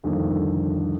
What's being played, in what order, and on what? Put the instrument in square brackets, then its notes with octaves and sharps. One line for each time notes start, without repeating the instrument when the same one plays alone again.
[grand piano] C2 F2 D3 D#3 A#3